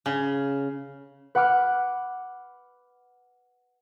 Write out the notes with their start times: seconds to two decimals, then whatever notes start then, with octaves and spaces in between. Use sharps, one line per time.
0.06 C#3
1.35 B4 F#5 B5 D6 F6